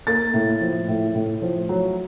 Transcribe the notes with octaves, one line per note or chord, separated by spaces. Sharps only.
A#3 A6
A2
F3
A2
A2
F3
F#3